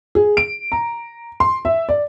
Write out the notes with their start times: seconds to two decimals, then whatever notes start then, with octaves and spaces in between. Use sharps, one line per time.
0.15 G#4
0.37 D7
0.72 A#5
1.40 C6
1.65 E5
1.89 D5